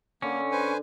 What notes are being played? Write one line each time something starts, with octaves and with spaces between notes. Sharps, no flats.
D3 A#3 C#4
B4 C5 G#5